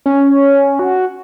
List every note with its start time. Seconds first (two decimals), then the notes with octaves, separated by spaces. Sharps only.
0.06 C#4
0.79 F#4